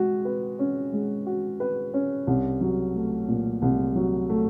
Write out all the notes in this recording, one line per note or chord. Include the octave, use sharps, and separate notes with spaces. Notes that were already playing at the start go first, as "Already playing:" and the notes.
Already playing: G#3 F#4
B4
C#4
G#3
F#4
B4
C#4
C2
F#3
A3
A#2
C2
F#3
A3